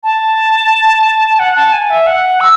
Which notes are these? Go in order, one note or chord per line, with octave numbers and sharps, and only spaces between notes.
A5
F#5
A5
G#5
E5
F#5
E6